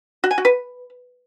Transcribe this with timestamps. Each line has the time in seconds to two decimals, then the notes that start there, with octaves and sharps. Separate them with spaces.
0.24 F#4
0.31 G#5
0.38 F#4
0.45 B4